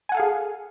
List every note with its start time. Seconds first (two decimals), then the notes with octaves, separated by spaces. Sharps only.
0.09 G#5
0.12 F#5
0.14 A4
0.17 F5
0.20 G#4